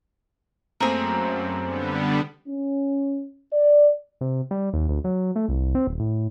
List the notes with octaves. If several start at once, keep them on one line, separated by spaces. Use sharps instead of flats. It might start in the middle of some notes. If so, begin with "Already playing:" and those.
F#2 A3 A#3 C4 G#4 A#4
D3 G3 B3
C#4
D5
C3
G3
D#2
D2
F#3
A3
C2
C4
D#1
A2